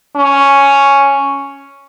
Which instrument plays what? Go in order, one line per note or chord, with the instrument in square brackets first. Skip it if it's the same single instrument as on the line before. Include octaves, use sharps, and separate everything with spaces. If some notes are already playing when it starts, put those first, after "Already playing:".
[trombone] C#4